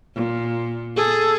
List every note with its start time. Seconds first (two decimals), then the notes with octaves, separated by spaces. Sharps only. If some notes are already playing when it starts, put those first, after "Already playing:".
0.15 A#2
0.96 G#4 A4